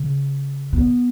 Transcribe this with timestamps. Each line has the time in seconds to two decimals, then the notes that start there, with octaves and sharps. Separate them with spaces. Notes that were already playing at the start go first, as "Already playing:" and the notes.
Already playing: C#3
0.73 B3